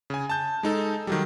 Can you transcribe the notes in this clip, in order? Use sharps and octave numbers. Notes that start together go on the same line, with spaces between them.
C#3 G#5
A5 G6
G#3 D#4 A4
D#3 F#3 G3